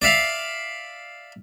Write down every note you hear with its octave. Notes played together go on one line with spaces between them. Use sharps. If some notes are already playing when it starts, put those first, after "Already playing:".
D5 E5 F5